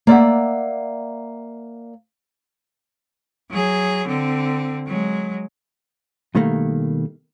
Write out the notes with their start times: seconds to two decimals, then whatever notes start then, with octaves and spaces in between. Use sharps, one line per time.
0.07 A#3 D5 E5 F#5
3.50 F#3 G#4
4.07 D3 C4
4.87 F#3 G#3
6.35 B2 D#3 G3 A3 A#3